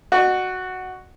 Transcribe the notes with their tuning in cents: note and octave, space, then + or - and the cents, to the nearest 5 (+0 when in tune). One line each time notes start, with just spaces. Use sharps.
F#4 +0 D#5 -45